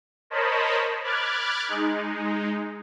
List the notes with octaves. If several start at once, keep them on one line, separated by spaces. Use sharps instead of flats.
A#4 C5 C#5 D#5 A5 B5
B5 D6 F6 F#6 G#6 A6
G#3 D#4